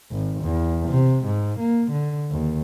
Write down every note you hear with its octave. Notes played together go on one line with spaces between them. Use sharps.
G#1
E2
C3
G#2
A#3
D3
D#2